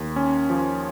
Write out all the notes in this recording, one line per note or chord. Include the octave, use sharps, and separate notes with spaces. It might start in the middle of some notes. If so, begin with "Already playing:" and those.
Already playing: D#2
C#4
F3